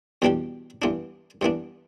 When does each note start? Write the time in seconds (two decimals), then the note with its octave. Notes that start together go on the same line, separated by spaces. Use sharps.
0.22 E2 B2 G3 D4 G4
0.82 G2 E3 B3 D4
1.41 G2 E3 B3 D4